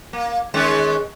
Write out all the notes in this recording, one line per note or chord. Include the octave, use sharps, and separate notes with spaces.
A#3
D#3 G#3 C#4